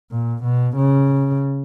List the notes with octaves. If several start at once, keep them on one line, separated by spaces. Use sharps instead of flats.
A#2
B2
C#3